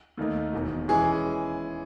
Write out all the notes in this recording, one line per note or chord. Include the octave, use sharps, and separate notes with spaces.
D#2 D#3 A3 D#4
E1 E2 D#3
E3 G#3 C#4 G#4